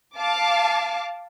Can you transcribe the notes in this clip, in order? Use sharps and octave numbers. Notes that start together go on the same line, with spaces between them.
F5 A5 D6